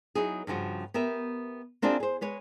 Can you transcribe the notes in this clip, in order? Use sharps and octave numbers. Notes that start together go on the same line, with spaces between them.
F#3 D#4 E4 G#4
G2 C#3 F3 F#4
B3 G4 A#4 E5
A#3 C4 D4 E4 F4 G#4
G#4 C5
G#3 B4 C#5